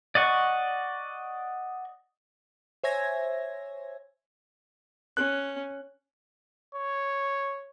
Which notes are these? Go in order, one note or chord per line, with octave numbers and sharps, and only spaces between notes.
D5 D#5 F#5 C#6
C5 C#5 E5 G#5 G#6 A#6
C#4 F#6
C#5